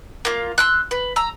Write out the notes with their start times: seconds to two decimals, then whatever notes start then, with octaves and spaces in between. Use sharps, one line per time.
0.25 A#3 F4
0.58 C6 E6 F#6
0.91 B4
1.16 A#5 E6